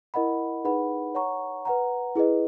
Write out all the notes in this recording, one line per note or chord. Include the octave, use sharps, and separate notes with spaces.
E4 A#4 D#5 F#5 B5
D#4 G#4 B4 F#5 B5
C#5 F#5 A#5 C#6
B4 F#5 A#5
E4 G#4 B4 D#5